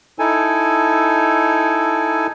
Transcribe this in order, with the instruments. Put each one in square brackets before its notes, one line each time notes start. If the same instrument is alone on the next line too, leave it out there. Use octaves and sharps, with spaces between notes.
[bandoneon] D#4 E4 A4 G#5